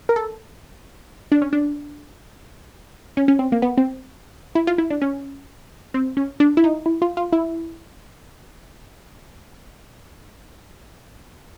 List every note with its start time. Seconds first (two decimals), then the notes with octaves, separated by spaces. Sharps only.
0.09 A#4
0.16 A4
1.32 D4
1.42 C#4
1.53 D4
3.17 C#4
3.28 C#4
3.39 C4
3.52 A#3
3.62 B3
3.78 C4
4.55 E4
4.67 F4
4.78 E4
4.90 D4
5.02 C#4
5.94 C4
6.17 C#4
6.40 D4
6.57 E4
6.64 D#4
6.86 E4
7.02 F4
7.17 F4
7.32 E4